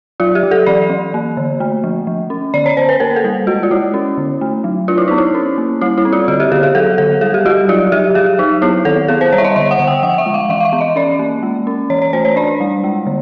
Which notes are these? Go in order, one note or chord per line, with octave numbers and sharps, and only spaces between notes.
F#3 F4
G4
F#3
A4
E3 D5
E3
A#3
D3
A3
F3
F3
C#4
D3 D5
C#5
D3 C5
B4
A#3 A#4
A4
G3
G#3 F#4
F4
G#3 E4
C#4
D3
A3
F#3
D4 F4
E4
B3 D#4
E4
C#4
A#3
G3 E4
E4
C4
F4
D3 F#4
G4
D3 G#4
G#4
F#3 A4
D3 A4
G3 G#4
G4
G3 F#4
F#3 F4
F#3 G4
F#3 G#4
F#3 D#4
B3 E4
D#3 A4
B3 G#4
C5
G3 C#5
E5
D#5
D3 E5
F#5
D3
G5
F3 F#5
E5
G#3
F5
E3 E5
F5
E5
B3
D#5
C#4 D5
A#3
G#3
C#4
E3 C#5
C#5
A3 C5
C#5
D4 D5
G3
G#3
D3